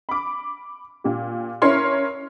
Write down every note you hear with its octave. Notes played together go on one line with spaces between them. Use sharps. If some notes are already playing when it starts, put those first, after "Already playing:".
B5 D6
A#2 G4
C#4 E4 A#4 C#5 C6